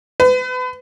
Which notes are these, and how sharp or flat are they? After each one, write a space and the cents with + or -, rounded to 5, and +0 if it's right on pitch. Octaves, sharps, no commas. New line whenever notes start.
B4 +35